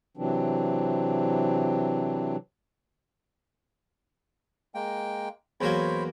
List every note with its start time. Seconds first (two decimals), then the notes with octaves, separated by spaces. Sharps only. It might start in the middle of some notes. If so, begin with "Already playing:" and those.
0.17 C3 E3 F#3 C4 D4
4.75 G#3 A#3 G5
5.61 E2 F#3 A#3 C5 C#5 B5